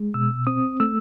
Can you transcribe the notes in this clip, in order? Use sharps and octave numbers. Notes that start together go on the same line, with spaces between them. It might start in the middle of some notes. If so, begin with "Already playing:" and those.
Already playing: G#3
B2 E6
C4 D#6
A3 E6